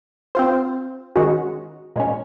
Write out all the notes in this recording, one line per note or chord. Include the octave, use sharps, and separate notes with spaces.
C4 F4 C5
D#3 G#3 C#4 F#4
A#2 G#3 C#4